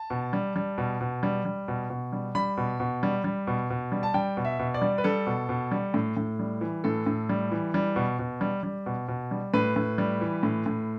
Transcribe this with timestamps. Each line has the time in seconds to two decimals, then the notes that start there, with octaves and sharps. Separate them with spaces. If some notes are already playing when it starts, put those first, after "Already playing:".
Already playing: A5
0.10 B2
0.33 G3
0.56 G3
0.78 B2
1.01 B2
1.23 G3
1.45 G3
1.68 B2
1.90 B2
2.13 G3
2.35 G3 B5
2.57 B2
2.80 B2
3.03 G3
3.24 G3
3.47 B2
3.70 B2
3.92 G3
4.03 A5
4.14 G3 G5
4.37 B2
4.45 E5
4.59 B2
4.74 D5
4.82 G3
4.98 B4
5.04 G3 A4
5.27 B2
5.49 B2
5.71 G3
5.94 A2
6.17 A2
6.39 G3
6.61 E3
6.84 A2 A4
7.07 A2
7.29 G3
7.51 E3
7.74 G3
7.96 B2
8.19 B2
8.41 G3
8.63 G3
8.86 B2
9.08 B2
9.31 G3
9.54 A2 B4
9.76 A2
9.98 G3
10.21 E3
10.43 A2
10.66 A2